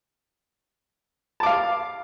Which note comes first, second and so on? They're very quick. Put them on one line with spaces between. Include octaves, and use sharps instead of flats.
A5 D6 F5